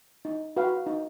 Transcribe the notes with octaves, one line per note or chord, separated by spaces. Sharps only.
D#4
F#4 B4 F5
D#4